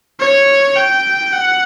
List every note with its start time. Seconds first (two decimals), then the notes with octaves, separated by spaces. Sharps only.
0.20 C#5
0.76 G5
1.32 F#5